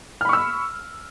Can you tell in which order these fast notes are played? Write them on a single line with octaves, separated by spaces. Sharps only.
F6 B5 C#6 E6